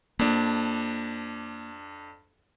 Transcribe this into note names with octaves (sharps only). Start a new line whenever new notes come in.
F2 A#3 D4